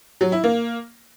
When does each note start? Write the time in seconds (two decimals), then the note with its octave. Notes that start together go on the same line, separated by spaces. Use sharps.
0.21 F#3
0.32 E4
0.44 A#3